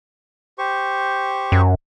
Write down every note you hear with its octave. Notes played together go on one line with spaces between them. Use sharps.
G4 C5 C#6
F#2